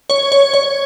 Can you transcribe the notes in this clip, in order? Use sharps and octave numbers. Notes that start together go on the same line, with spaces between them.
C#5
C#5
C#5